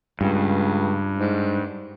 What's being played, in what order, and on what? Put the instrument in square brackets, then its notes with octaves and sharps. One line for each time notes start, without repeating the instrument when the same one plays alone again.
[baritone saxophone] C#2 [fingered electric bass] G2
[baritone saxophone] G#2